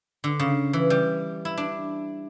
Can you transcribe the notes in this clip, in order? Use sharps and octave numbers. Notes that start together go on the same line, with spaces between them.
D3
C#3
E3
G3
E4
D4